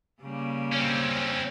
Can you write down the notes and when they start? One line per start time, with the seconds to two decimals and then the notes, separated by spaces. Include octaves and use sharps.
0.21 C#3 G3 A#3
0.72 C4 C#4